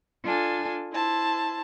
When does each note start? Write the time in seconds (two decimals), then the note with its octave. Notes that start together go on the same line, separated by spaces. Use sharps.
0.24 D4 F4 A4 G#5
0.92 E4 C5 A5